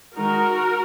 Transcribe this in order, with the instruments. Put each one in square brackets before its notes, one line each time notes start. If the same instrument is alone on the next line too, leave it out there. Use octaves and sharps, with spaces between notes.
[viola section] D#3 G#3 D#4 F#4 A#4